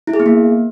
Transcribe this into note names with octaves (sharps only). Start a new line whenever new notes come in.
E4
G#4
B3
A#3